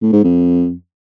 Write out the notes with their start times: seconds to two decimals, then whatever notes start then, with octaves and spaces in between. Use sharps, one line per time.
0.02 A2
0.13 G#2
0.24 F2